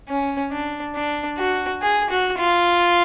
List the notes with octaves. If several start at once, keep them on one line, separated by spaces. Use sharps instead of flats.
C#4
D4
D4
F#4
G#4
F#4
F4